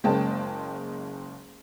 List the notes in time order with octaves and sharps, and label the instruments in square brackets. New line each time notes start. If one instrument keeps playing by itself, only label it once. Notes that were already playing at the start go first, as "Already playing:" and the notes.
[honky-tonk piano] F#1 G#3 A#3 C#4 G5 A5